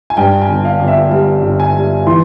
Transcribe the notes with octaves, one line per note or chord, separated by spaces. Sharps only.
G#5
G2 G5
G#5
G1
F5
G1
E5
G3
G1
G#5
G3
E3 C6